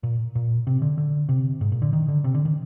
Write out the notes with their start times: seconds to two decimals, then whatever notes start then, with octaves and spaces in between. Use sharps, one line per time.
0.03 A#2
0.35 A#2
0.67 C3
0.82 D3
0.98 D3
1.29 C3
1.61 G#2
1.72 A#2
1.82 D3
1.93 D#3
2.08 D3
2.24 C3
2.34 D3
2.45 D#3